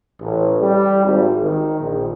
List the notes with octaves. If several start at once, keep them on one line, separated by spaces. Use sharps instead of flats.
A1
G3
G#1
D#3
A#1